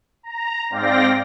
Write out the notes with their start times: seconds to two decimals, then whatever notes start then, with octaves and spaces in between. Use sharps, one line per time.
0.23 A#5
0.70 G#2 C4 D5 F5 G5 A#6